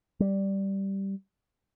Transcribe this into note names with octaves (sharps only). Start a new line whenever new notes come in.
G3